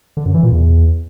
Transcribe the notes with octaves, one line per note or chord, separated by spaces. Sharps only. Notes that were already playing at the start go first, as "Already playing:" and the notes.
D3
F#2
E3
A#2
E2